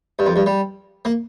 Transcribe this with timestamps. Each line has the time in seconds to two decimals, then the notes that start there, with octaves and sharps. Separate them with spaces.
0.19 G2
0.26 F2
0.36 G2
0.46 G3
1.05 A#3